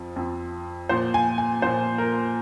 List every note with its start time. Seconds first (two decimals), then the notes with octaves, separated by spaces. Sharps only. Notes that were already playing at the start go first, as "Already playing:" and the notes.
Already playing: F2 F3
0.16 F2 F3
0.89 A#2 F3 C5
1.14 G#5
1.38 G#5
1.62 A#2 F3 C5
1.98 A#4